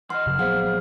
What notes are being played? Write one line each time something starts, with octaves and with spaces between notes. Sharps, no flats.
E3 D#5 F#5 C6 F6
B1 C#3 F#3
F3 F#3 B3 G#4 C5 F5 F#5